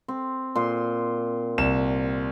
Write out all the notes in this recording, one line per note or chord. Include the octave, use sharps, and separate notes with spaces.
C4
A#2 C6
C2 E7